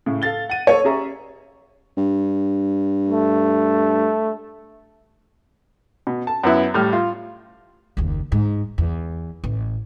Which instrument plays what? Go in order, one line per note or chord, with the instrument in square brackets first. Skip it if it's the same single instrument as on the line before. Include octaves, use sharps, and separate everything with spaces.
[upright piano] A2 C#3
A4 F5 A6 G7
F#5 D#7
A4 C5 C#5
C#4 G4 G#4 E5 A#5 C#6
[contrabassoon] G2
[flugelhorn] A3
[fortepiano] B2
A5
F#2 B3 E4
A2 G3 F6
F4
[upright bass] F#1 D#2
G#2
E2
A1